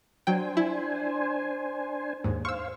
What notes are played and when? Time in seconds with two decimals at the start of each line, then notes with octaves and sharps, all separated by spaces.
0.27 F#3 D4 C5 G5 G#5
0.57 E4
2.24 D#2 G#2
2.45 C5 F5 C#6 E6